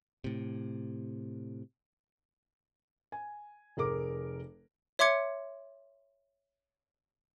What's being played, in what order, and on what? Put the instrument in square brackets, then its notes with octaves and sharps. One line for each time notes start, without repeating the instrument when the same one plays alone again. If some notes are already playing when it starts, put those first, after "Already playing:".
[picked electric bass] A2 C3
[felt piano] G#5
F1 G#4 A#4 D6
[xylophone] C#5 E5 C6 D6 G#6 C#7